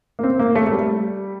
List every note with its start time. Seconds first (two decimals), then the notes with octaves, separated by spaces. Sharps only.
0.19 A#3
0.23 C4
0.39 A#3
0.55 A3
0.67 A3
0.72 G3